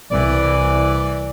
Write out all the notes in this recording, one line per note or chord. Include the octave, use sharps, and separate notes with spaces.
C2 E3 D5